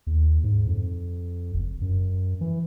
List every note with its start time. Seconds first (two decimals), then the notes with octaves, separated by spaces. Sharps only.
0.07 D#2
0.44 G#2
0.67 F2
1.54 F#1
1.81 F#2
2.41 E3